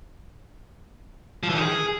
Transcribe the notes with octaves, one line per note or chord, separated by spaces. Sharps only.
F3
E3
D#3
G#4